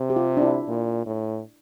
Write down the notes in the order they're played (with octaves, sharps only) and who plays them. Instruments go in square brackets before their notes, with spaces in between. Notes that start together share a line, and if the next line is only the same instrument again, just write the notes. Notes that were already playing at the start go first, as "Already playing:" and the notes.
Already playing: [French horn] C3
[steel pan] G4
F4
D4
E4
[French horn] A#2
A2